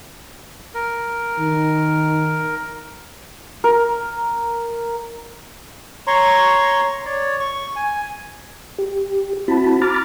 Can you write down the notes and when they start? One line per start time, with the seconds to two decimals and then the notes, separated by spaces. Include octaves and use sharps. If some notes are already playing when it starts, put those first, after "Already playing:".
0.74 A#4
1.39 D#3
3.64 A#4
6.07 C#5 A#5 C6 C#6
7.05 C#5 D5
7.40 C#6
7.76 G#5
8.79 G4
9.48 C4 E4 F#4 A5 B5
9.82 A#5 B5 D6 F6 A6